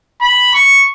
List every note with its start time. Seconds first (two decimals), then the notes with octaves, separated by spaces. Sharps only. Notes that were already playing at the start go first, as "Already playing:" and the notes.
0.21 B5
0.54 C#6